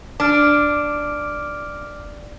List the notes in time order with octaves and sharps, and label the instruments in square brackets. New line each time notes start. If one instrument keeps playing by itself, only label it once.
[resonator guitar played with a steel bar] D4 [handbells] D6 F6 D7